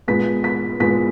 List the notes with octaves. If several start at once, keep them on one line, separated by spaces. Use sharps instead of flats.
A#2 G#3 B3 B6
B6
A#2 G#3 B3 B6